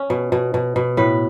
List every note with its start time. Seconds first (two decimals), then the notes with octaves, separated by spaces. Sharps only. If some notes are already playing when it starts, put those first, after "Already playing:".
Already playing: C#4
0.10 B2
0.32 B2
0.54 B2
0.76 B2
0.97 A2 B4